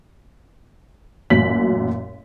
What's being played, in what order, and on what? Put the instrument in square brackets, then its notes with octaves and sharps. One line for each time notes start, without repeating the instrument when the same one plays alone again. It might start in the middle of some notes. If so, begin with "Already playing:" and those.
[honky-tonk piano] A1 F#2 A#2 F#3 B6 F#7